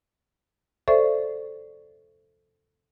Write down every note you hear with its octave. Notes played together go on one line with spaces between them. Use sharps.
A4 C5 D5 E5 C#6